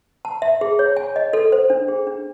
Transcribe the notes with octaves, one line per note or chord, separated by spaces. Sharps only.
A5
E5
G#4
C#5
G#5
D#5
A4
C5
D4
G#4
D4